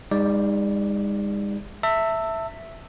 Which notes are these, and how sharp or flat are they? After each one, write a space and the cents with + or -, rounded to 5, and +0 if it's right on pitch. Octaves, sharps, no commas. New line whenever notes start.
G#3 -40 D#4 +0 D5 +0
E5 +0 A5 +40